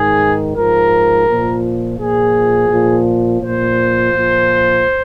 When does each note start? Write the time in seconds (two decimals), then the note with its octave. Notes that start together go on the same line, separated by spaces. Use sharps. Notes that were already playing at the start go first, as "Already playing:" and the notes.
Already playing: G#2 D#3 G#4
0.55 G#2 F3 A#4
1.27 A#2 F3
1.98 A#2 F3 G#4
2.70 A#2 F3
3.42 A#2 F3 C5
4.13 A#2 F3